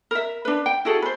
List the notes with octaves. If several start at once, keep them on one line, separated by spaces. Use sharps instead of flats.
A#4 E5
D4 B4
G5
E4 F#4 G#4 A4
B4 C5